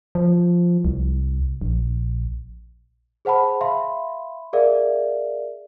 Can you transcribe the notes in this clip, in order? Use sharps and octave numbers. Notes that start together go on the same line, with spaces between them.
F3
C2
A#1
G#4 C5 F#5 A5 B5
E5 F5 B5 C6
G#4 A#4 D5 E5 F5